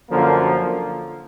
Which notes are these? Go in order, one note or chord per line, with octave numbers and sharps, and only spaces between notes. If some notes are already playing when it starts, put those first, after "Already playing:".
F#2 D3 F3 A#3